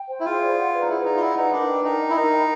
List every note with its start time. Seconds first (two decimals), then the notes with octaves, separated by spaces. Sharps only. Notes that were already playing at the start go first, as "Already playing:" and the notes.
Already playing: G5
0.10 C5
0.20 E4
0.25 F4 G#4
0.42 D5
0.58 F#5
0.73 B4
0.81 D#4
0.89 E4 G#4
1.05 D#4 D5
1.17 F4
1.21 E4 F#5
1.37 D#4 B4
1.52 D4 A#4
1.68 G5
1.84 D#4 A#4
2.00 D#5
2.10 E4
2.16 D#4 A#4
2.32 G5